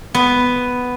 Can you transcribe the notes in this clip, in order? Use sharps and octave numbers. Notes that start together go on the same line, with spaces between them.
B3